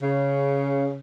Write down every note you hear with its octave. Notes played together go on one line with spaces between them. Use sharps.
C#3